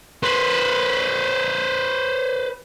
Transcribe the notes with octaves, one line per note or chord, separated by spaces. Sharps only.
B4 C5